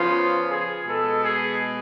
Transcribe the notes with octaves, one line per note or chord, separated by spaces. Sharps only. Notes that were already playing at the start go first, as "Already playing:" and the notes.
Already playing: C#3 F3 B3 F4
G#4
B2 G#3 B3 A4
G#4